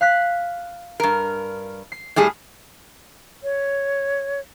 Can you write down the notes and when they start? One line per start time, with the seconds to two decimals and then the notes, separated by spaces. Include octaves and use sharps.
0.01 F5 F#6 B6
1.00 G2 A#4
1.92 C7
2.16 A2 G3 G#4
3.43 C#5